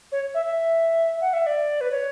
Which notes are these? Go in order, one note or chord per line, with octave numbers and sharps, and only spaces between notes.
C#5
E5
E5
F#5
E5
D5
B4
C#5